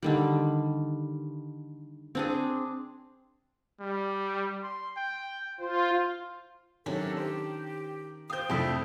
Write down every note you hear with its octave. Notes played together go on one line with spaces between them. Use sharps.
D3 D#3 G3
C4 D4 G#4
G3
C6
G5
F4 C5
C3 D#3 F#3 C#4 D4 A4
G4 C5
C5 F5 G5 D#6 G6
F2 C3 F3 A3 D4 E4 A5 C6